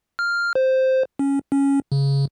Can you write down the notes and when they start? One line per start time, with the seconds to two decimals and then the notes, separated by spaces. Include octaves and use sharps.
0.19 F6
0.55 C5
1.19 C#4
1.52 C#4
1.92 C#3